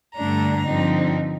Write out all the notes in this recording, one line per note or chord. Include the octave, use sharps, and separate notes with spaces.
G2 D3 A3 D4 A#5
G2 D3 F3 C4 D#4